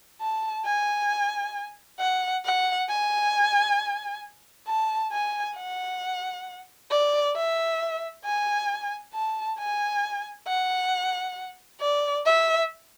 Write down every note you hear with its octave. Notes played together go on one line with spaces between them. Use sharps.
A5
G#5
F#5
F#5
G#5
A5
G#5
F#5
D5
E5
G#5
A5
G#5
F#5
D5
E5